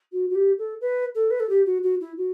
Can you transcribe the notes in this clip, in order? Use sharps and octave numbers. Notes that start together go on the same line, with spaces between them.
F#4
F#4
G4
A4
B4
A4
B4
A4
G4
F#4
F#4
E4
F#4